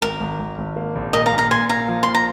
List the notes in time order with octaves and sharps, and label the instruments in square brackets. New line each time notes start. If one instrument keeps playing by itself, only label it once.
[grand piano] G#1 [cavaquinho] A#4
[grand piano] G#1
G#1
G#1
A#3
A#1
[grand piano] A#2 [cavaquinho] A#4 D#5
[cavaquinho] F5 A#5
[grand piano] A#2
[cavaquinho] F5 A#5
[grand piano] A#2 [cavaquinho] G#5 C6
[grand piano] A#3 [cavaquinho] F5 A#5
[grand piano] F3
[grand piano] A#2 [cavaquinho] C6
[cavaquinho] A#5